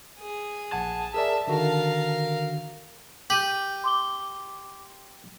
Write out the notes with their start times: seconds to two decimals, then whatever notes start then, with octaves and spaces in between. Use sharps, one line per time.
0.19 G#4
0.72 A#1 F#5 A5 G#6
1.14 G#4 A#4 D5 E5
1.47 D3 D#3 F#4 A#4 F5
3.30 G4 G6 D#7 F#7
3.84 C6 D6 G7